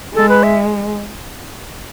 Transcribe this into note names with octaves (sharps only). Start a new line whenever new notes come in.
G#3 A4
B4
E5